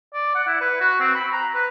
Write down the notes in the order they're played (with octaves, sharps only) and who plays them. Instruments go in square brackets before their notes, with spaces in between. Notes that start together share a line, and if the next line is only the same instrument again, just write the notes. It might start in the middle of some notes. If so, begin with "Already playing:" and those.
[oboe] D5
F#5
E4
B4
F#4
C4
B5
A#5
B4